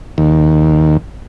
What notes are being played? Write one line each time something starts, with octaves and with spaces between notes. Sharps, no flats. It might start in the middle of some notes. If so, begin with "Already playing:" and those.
D#2